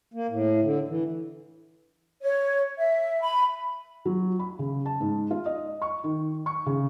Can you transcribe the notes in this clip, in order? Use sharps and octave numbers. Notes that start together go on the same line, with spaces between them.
A#3
A2
D3
E3
C#5
E5
B5
F#3
B5
C#3
A5
G#2
F4
D#5
C#6
D#3
C#6
C#3